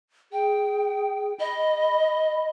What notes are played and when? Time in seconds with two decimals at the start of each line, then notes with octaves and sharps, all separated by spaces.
0.32 G#4 G5
1.40 D#5 B5